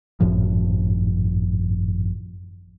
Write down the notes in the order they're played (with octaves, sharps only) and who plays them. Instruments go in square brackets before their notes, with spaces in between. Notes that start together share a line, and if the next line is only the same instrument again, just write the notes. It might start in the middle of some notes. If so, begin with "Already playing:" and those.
[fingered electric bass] G#1 F#2 A2 F3